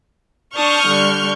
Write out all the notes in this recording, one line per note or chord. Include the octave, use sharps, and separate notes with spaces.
D4 A5 C#6 D#6 F6 G6
D3 G3